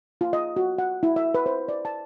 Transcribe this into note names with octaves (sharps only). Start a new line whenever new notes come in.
F4
D#5
F#4
F#5
E4
E5
B4
C5
D5
A5